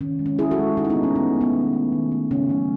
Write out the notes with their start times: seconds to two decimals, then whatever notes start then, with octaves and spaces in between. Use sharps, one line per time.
0.01 D#3 C#4
0.19 G#3
0.26 C#4
0.39 D#3 E4 G#4
0.51 F#4 A4
0.58 G#3
0.77 D#3 D#4 F#4
0.85 E4
0.90 B3 D#4
0.96 A3
1.03 C#4
1.15 D#3 B3
1.35 A3
1.41 B3 D#4
1.54 D#3
1.73 A3
1.92 D#3
2.12 A3
2.31 C#3 C#4
2.49 F#3 A3